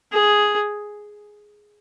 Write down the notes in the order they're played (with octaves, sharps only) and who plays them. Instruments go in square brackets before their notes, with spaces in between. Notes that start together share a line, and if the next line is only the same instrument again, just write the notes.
[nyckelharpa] G#4